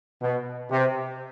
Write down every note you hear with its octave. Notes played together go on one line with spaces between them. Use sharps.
B2
C3